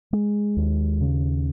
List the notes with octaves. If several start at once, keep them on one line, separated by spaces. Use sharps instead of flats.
G#3
D#2
C#3